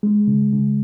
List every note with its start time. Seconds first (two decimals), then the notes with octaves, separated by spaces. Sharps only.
0.03 G#3
0.28 C#3
0.53 C#3